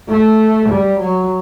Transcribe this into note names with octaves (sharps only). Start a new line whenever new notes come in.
A3
G3
F#3